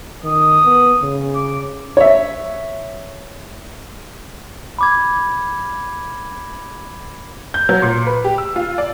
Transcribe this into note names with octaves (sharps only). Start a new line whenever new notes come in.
D#3 D#6
B3
C#3
D6
C#5 E5
B5 D6 G#6
G6
F#3
A#2
B4
G4
E6
F4
D5